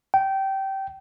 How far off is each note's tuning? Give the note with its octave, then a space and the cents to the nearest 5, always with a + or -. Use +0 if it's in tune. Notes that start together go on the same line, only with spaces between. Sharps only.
G5 -20